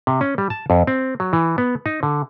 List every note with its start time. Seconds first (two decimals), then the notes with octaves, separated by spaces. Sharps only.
0.07 C3
0.21 C#4
0.38 G3
0.50 A5
0.70 F2
0.87 C4
1.20 F#3
1.33 E3
1.58 B3
1.86 D#4
2.03 D3